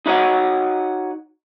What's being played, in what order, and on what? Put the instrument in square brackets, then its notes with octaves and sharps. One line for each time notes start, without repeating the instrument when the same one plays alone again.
[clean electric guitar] D#4 E4 F#4 C#5 D#5 F#5